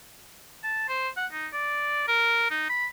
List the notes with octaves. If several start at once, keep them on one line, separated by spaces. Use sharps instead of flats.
A5
C5
F#5
D#4
D5
A#4
D#4
B5